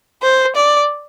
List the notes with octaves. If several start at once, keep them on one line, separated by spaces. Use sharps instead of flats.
C5
D5